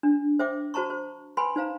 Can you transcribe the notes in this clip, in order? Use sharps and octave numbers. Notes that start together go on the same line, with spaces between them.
D4
C5 E5 G5 D6
F#4 C5 A5 A#5 C#6
C5
B4 G5 G#5 B5 C6
D#4 C5 F5 A#5